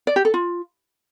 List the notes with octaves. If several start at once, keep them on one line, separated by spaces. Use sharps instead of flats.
D5
G4
A4
F4